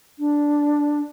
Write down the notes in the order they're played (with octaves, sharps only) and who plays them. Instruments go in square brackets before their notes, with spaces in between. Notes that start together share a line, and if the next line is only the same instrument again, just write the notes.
[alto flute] D4